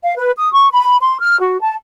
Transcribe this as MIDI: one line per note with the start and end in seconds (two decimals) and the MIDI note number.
0.03 0.13 77
0.16 0.31 71
0.36 0.51 87
0.52 0.68 85
0.71 0.97 83
1.00 1.17 84
1.21 1.39 89
1.40 1.59 66
1.60 1.75 81